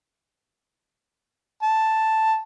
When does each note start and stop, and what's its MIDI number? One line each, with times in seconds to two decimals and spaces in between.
1.63 2.41 81